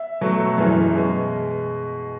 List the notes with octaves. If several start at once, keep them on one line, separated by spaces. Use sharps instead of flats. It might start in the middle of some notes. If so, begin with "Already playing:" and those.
Already playing: E5
B2 F#3 A3
F#2 E3 G#3
B2 G#3